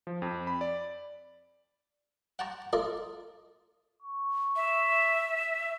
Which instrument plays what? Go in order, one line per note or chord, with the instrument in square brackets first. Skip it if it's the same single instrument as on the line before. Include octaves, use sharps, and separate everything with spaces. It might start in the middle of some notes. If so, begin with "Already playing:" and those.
[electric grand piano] F3
F2
B5
D5
[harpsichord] F#5 G5 A5 A#5 C#6
F4 A4 A#4 D5 D#5
[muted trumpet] C#6
[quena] E5